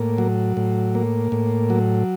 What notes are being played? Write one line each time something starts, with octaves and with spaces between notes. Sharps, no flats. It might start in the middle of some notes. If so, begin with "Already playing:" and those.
Already playing: A2 A#3
F#3
A2
A#3
A2
F#3